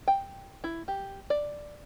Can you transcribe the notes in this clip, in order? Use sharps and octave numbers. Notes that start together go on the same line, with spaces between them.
G5
E4
G4
D5